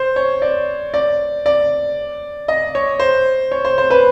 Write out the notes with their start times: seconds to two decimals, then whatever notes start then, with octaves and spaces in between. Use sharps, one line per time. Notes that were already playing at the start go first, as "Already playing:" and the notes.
Already playing: C5
0.16 C#5
0.42 D5
0.94 D5
1.46 D5
2.48 D#5
2.75 C#5
2.99 C5
3.51 C#5
3.65 C5
3.78 C5
3.90 B4